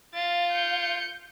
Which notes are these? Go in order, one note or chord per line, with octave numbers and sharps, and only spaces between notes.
F4 F5 A6
G6 C#7